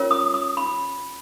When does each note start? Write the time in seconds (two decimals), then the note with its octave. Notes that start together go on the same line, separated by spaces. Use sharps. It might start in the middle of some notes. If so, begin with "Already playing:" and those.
Already playing: C#4 F4 A#4 C#5
0.11 D#6
0.34 D#6
0.57 B5